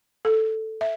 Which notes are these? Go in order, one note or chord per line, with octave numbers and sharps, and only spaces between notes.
A4
E5